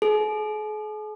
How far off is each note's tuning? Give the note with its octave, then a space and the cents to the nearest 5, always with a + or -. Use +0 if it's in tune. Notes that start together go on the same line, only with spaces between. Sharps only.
G#4 +45